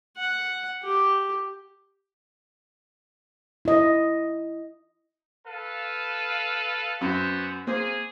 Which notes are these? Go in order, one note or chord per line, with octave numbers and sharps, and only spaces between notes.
F#5
G4
E4 D#5
A4 B4 F5
F#2 B3 F#4 C5
A#3 G#4 C5